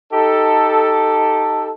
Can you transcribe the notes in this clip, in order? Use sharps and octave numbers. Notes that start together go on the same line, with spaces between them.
D#4 G4 A4